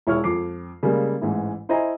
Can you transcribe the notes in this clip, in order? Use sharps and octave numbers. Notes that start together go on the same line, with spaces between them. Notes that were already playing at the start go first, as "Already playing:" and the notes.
E1 E4 C#5 C#6 F6
F2 D6 C7
C#3 G3 G#3 A#3
A1 G#2 E3 E4
E4 C5 D#5 E5 G#5 A#5